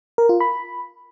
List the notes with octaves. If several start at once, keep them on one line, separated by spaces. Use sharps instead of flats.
A#4
F4
B5